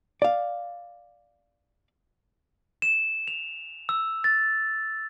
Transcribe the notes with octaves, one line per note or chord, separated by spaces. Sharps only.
D5 F5
E7
F7
E6
A6